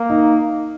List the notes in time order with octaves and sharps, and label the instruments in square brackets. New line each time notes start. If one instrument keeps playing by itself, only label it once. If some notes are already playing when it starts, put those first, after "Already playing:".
Already playing: [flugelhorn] A#3
[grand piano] D#4